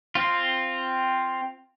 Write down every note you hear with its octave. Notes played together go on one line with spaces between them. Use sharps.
C4 F4